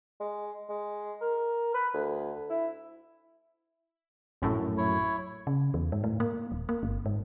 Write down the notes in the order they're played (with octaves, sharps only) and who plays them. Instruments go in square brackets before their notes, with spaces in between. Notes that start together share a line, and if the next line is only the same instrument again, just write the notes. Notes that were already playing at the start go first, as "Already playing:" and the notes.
[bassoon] G#3
G#3
A#4
B4
D2
E4
[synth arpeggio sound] A#1 F#2 A2
[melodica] E4 C#5
[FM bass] C#3
E2
G#2
A2
A#3
D#1
A#3
G1
G#2